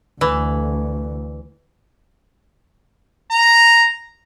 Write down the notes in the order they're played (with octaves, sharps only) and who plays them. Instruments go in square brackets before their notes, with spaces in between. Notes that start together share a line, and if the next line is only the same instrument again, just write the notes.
[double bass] D2 [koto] E3
[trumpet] A#5